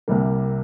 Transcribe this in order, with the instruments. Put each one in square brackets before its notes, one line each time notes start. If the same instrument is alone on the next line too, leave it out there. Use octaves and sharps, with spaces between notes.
[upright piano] C2 C3 G3 A#3